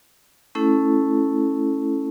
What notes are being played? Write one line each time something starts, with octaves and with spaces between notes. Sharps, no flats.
A3 C#4 E4 A4